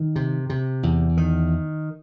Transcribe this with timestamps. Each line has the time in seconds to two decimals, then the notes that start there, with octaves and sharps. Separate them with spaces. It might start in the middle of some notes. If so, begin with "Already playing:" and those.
Already playing: D#3
0.16 C3
0.49 C3
0.83 E2
1.17 D#3